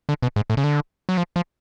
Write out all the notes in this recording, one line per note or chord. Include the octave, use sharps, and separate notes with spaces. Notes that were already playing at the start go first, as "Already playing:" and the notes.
D3
B2
G#2
A2
C#3
D3
F#3
F3
F3